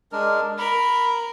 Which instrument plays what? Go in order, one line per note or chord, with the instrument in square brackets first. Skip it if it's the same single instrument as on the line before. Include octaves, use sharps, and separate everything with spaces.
[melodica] G#3 D4 A#4
[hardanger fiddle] A#4 [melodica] B5